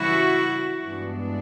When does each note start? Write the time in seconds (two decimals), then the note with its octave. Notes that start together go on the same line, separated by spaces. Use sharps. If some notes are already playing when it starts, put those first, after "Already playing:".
Already playing: C#3 E3 G3 E4 F#4
0.83 G2 E3 G#3 B3 D4